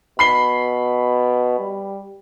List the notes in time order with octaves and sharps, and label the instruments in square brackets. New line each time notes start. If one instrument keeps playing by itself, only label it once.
[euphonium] B2 [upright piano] B5 C7 G7
[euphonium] G3